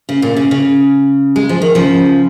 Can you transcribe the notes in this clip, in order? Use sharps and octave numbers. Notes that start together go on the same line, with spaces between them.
C#3
A#2
C#3
C#3
G#3
F3
D#3
C#3 F3